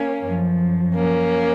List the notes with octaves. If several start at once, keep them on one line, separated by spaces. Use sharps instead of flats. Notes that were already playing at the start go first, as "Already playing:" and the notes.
Already playing: A#3 C#4
F#2 F3
A#3 C#4